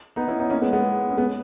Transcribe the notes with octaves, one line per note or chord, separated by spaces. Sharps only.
B3 D#4
C#4 E4
B3 D#4
A#3 C#4
G#3 B3
G#3 B3
C#4
G#3 B3